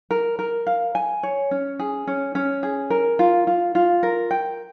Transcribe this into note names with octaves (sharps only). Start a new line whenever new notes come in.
A#4
A#4
F5
G#5
C#5
C#4
G#4
C#4
C#4
G#4
A#4
F4
F4
F4
A#4
G5